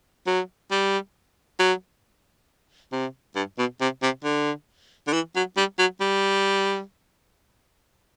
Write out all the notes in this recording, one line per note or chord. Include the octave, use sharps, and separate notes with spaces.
F#3
G3
F#3
C3
G2
B2
C3
C3
D3
D3
E3
F#3
G3
F#3
G3